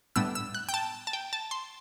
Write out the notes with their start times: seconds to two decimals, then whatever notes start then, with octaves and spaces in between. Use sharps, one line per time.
0.16 A2 G3 B3 D4 E6
0.35 E6
0.55 F#6
0.69 G5
0.74 A5
1.07 A5
1.13 G5
1.33 A5
1.51 C6